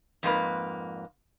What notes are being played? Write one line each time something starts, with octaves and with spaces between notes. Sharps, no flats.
F2 G#2 A#3 B4